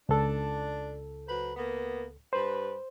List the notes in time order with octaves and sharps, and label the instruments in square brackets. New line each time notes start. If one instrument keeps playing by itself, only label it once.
[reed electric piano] C#2 A4 [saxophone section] D4
[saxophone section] F#3 B4 C5
A#3 B3
[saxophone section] G2 B4 [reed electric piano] C5